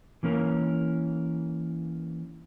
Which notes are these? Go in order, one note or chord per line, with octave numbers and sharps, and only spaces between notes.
E3 A#3 C#4 A#4